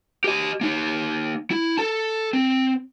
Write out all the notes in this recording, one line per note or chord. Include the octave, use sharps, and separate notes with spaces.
G4 D#5
A#3 D#4
E4
A4 A5
C4